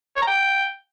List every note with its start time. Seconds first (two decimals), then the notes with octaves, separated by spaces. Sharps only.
0.16 C#5
0.22 A#5
0.27 G5